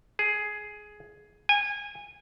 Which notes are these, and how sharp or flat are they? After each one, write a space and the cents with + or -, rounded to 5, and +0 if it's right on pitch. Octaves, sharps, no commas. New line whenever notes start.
G#4 +10
G#5 -25